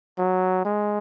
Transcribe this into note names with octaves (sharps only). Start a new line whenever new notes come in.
F#3
G#3